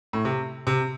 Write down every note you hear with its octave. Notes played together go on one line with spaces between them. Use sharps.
A2
C3
C3